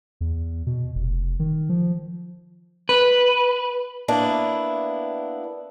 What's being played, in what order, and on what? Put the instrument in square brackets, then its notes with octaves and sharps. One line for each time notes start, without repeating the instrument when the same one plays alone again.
[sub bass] E2
B2
F1
D#3
F3
[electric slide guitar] B4
[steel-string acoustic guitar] A#3 B3 D4 E4